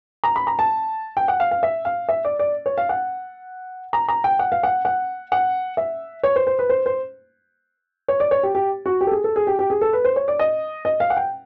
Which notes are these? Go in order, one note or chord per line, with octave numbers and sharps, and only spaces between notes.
A#5
B5
A#5
A5
G5
F#5
F5
F5
E5
F5
E5
D5
D5
C#5
F5
F#5
A#5
A#5
G5
F#5
F5
F#5
F#5
F#5
E5
C#5
C5
C5
B4
C5
C5
C#5
D5
C#5
G4
G4
F#4
G4
A4
G#4
A4
G#4
G4
G4
G#4
A4
B4
C5
C#5
D5
D#5
D#5
F5
F#5
G5